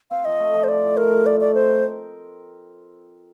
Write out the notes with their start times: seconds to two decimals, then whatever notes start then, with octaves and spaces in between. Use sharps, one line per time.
0.11 C4 F5
0.25 F3 D#5
0.40 A3
0.54 F3
0.64 C5
0.69 D#4 D5
0.83 A2
0.97 A3 A#4
1.12 A2
1.26 D#4 D5
1.40 A3 D5
1.55 C4 C5
1.70 A#4